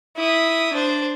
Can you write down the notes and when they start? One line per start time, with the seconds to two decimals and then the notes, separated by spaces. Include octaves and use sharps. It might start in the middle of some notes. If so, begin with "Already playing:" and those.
0.16 E4 D#6
0.73 D4 C5